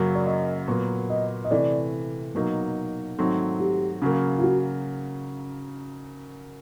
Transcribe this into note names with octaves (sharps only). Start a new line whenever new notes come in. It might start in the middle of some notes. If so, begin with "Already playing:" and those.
Already playing: F#2 C#3 F#3 A#3
D5
D#5
A#2 F#3 B3
D#5
D#5
C3 E3 A3 D5
B2 F#3 A#3 D#4
G#2 D#3 F#3 A3 C4
G4
C#3 F#3 A#3
F4
F#4